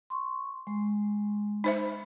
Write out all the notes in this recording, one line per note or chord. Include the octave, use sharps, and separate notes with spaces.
C6 C#6
G#3
D#4 C5 E5